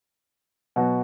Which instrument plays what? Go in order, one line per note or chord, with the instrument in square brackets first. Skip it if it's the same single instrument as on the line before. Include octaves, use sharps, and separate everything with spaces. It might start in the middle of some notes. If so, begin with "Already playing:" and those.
[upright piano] B2 F#3 B3 F#4